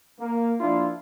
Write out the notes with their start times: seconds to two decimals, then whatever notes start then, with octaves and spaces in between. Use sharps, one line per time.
0.20 A#3
0.60 F3 A#3 D4 E4 F4